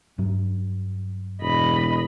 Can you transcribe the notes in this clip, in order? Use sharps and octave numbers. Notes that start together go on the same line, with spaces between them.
G2 F#3
E1 D#5 B5